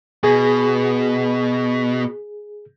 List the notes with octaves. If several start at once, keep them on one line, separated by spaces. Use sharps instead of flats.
B2 G#4